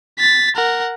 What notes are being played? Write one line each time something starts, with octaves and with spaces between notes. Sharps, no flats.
A6 B6
A#4 F#5